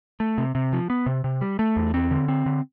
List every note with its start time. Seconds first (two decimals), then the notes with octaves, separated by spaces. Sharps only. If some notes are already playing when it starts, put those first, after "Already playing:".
0.20 A3
0.38 C3
0.55 C3
0.73 F3
0.90 B3
1.06 C3
1.24 C3
1.41 G3
1.59 A3
1.76 E2
1.94 C4
2.11 D3
2.28 C4
2.46 D3